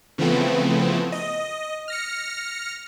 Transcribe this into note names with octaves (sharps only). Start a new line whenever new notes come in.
C#3 E3 F3 A3 B3 C4
D#5
F6 A#6 C#7